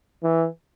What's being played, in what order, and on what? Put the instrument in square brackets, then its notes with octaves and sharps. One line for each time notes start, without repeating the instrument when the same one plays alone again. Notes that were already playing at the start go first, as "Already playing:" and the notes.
[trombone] E3